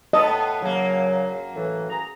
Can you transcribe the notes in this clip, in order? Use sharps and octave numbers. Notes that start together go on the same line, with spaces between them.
A2 B3 A4 D#5
F#2 A#2 C#3 F#3 A#3
A2 E3
G#4 A#5